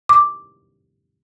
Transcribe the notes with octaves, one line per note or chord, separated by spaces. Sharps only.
D6